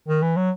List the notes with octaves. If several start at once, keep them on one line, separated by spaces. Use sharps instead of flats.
D#3
E3
F#3